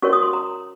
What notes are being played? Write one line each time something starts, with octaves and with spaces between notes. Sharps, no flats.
C#4 F#4 A#4 C#5 C#6
D#6
C6
A#5